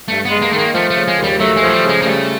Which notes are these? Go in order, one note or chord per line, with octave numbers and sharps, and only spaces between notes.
G2 A3
B3
G#3
A#3
D#3 A3
A#3
F3 A3
A3
C#3
G#3
D#2
G3
F#3 A3
G#3
F3 F#3
G3
C#3
G#3
A#3
G3 A3